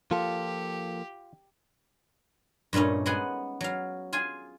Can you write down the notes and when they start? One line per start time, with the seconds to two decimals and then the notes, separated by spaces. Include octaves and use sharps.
0.11 F3 A#3 F4 G4 A4
2.73 G2 A#2 A3 C#4 D#4
3.06 G#3 B3 G#4 F#5
3.61 F#3 F5
4.13 F4 G#4 G#5